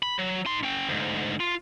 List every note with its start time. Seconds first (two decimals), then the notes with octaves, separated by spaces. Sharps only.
0.03 B5
0.19 F#3
0.46 D#4 C6
0.63 C#4 G5
0.89 D2 G#2
1.40 F4